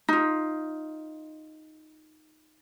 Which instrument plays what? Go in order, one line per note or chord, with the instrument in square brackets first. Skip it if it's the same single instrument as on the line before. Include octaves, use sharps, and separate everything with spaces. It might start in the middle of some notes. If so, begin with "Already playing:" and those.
[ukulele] D#4 F4